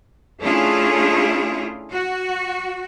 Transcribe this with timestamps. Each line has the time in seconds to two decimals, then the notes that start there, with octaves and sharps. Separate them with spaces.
0.41 A3 C#4 D4 E4 F4 G#4
1.92 F#4